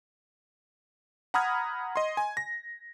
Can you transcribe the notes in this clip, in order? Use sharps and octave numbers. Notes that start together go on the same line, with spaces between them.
F#5 A#5 B5 D#6 F6 G#6
D#5 C6
G#5
A#6